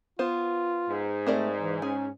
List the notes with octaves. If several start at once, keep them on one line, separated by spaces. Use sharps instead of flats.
B3 F4 C5
G#2
A3 C4 A#4 D5
E3
C#4 G#4